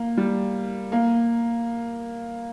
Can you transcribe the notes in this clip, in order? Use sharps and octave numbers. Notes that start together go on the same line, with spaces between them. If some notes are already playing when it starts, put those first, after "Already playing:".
Already playing: A#3
G3
A#3